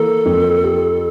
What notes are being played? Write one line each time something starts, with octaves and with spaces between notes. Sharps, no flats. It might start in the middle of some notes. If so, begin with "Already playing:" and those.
Already playing: E3 A#3 A4
F2
G4